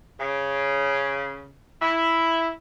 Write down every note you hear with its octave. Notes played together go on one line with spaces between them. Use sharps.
C#3
E4